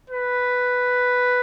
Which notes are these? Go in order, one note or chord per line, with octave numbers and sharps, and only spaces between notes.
B4